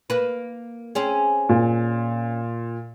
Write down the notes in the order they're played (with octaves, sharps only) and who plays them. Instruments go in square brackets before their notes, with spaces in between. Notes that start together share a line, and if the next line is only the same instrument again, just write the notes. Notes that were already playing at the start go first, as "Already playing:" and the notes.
[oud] A#3 B4
C4 C#4 G#4
[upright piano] A#2